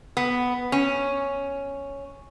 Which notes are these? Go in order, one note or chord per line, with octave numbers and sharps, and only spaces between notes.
B3
C#4